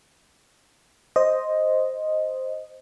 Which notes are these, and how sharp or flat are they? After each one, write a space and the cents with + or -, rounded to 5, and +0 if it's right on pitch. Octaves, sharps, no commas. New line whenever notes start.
C5 +0 D#5 +0